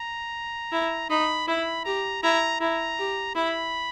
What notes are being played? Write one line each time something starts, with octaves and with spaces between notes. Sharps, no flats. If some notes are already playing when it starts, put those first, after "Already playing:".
Already playing: A#5
E4
D#4 B5
E4 B5
G4 A#5
E4 A#5
E4 A#5
G4
E4 B5